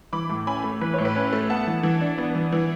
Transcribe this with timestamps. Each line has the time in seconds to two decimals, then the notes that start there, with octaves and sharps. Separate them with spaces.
0.13 E3 B5 D6
0.29 A2
0.47 C#4 G#5 B5
0.64 A3
0.81 E3 B4
0.94 A2 C#5
1.05 B4
1.16 C#4
1.33 A3
1.50 B3 F#5 A5
1.67 E3
1.83 E3
2.01 D4
2.18 B3
2.35 E3
2.52 E3